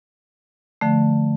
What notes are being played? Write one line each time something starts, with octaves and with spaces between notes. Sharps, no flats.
D3 F3 A3